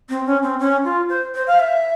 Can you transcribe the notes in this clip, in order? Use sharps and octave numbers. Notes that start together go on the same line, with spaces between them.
C4
C#4
C4
C#4
F4
C5
C5
F5
E5